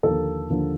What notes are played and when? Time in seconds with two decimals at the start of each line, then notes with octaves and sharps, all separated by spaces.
0.03 D#2 D3 F3 A#3 A4
0.50 D#2 D3 F3 A#3